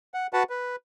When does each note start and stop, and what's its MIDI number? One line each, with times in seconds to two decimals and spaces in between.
0.14 0.27 78
0.33 0.43 66
0.33 0.43 71
0.33 0.43 78
0.33 0.43 81
0.50 0.76 71